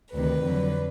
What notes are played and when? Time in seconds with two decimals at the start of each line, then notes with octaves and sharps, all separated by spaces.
0.13 D2 C3 D#3 B4
0.43 F2 D3 F#3